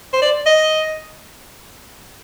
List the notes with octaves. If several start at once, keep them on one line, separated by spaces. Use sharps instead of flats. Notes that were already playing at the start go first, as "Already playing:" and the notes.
C5
D5
D#5